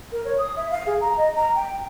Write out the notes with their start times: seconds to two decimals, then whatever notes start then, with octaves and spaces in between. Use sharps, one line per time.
0.12 A#4
0.25 C#5
0.39 D#6
0.56 E5
0.71 F5
0.87 G#4
1.01 A#5
1.17 D#5
1.36 A#5
1.55 G5